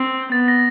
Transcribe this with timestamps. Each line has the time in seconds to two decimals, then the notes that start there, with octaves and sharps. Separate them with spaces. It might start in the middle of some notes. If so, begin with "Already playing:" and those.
Already playing: C4
0.32 B3 A6
0.48 A#6